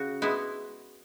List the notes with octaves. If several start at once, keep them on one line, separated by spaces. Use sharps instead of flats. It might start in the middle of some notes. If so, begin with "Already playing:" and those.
Already playing: C#3 F#4
G#3 B3 E4